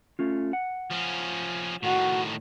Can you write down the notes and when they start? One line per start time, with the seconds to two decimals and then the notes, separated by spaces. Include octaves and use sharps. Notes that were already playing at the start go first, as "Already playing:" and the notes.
0.19 A3 C#4 F4
0.53 F#5
0.90 F3 C#4
1.83 A2 D#3 F#4